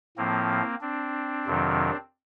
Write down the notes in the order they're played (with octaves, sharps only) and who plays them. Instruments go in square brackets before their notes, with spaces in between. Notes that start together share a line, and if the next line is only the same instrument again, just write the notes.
[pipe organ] A2 F3 A#3 C4
C4 D4
F2 C3 D#3 F#3